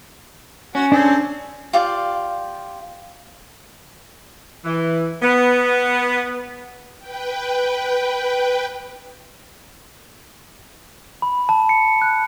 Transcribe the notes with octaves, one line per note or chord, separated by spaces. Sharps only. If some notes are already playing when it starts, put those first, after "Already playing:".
C#4 F#4
C4 D4 G#4 A4
F4 G4 D5 F5
E3
B3
B4 G5
B5
A5
C#7
F#6